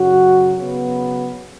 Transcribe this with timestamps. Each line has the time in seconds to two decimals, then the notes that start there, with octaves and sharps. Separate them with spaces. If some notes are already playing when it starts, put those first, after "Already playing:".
Already playing: F#2 C#3 F#3 F#4
0.57 C#3 F#3 B3